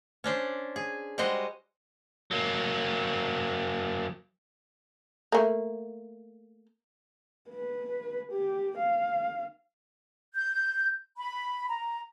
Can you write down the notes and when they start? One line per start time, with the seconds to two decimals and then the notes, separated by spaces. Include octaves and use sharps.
0.24 C#4 D4 C5
0.76 G#4
1.18 G3 G#3 F#4 C5 D#5
2.31 F#3 A#3
5.32 A3 A#3
7.49 B4
8.32 G4
8.78 F5
10.34 G6
11.17 B5
11.69 A#5